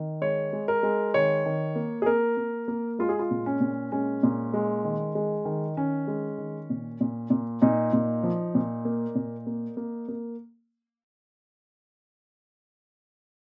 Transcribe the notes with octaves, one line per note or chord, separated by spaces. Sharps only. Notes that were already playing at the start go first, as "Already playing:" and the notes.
Already playing: D#3
G#3 C#5
G#3
A#4
G#3
D#3 C#5
D#3
A#3
G#4
A#3 A#4
A#3
A#3
G#3 F4
G#4
F4
A#2
C#4
A#2
G#3 C#4
A#2
G#3
D#3
G#3
D#3
D#3 C#4
G#3
D#3
A#2
A#2
A#2
A#2 D#4
A#2
F3
A#2
A#3
A#2
A#3
A#3
A#3